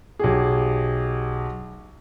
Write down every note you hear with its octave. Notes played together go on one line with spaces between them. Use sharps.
B1 G4 G#4